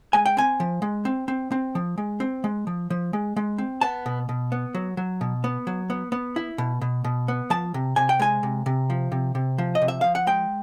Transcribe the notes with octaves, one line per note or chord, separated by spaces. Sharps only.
G#3 G#5
G5
C4 G#5
F3
G#3
C4
C4
C4
F3
G#3
C4
G#3
F3
F3
G#3
G#3
C4
B3 A5
B2
B2
B3
F#3
F#3
B2
B3
F#3
B3
B3
E4
B2
B2
B2
B3
F3 A5
C3
C3 G#5
G5
G#3 G#5
C3
C3
F3
C3
C3
F3
D#5
C3
E5
F3 F5
F#5
G#3 G5